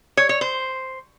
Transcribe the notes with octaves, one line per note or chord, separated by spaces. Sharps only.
C#5
C#5
C5